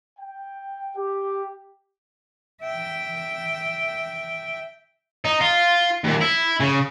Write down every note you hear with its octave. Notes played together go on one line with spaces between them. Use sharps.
G5
G4
E5 G5
D#4
F4
D#2 A#2
E4
C#3